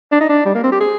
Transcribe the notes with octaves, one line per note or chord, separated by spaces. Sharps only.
D4
D#4
D4
G3
A#3
C4
G4
G#4